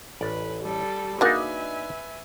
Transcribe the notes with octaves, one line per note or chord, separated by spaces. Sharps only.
A1 B4 D5
G3 A4
A#3 D4 D#4 F#4 G#4 B4 E5 G#5